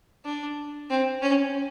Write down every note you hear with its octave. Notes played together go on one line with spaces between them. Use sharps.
D4
C4
C#4